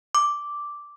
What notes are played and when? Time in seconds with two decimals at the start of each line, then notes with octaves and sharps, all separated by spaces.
0.15 D6